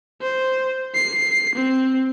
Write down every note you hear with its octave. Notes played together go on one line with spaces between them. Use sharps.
C5
C7
C4